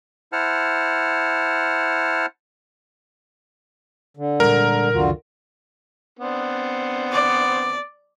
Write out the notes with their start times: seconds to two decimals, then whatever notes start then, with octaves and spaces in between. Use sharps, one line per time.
0.33 E4 C5 F#5 A5 F6
4.17 D3
4.40 A#2 G3 G#3 A#4
4.94 C#2 F#2 D3 D#3 F4 F#4
6.19 B3 C4 D4
7.13 D5